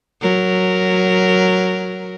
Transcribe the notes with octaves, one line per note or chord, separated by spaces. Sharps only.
F#3 A#4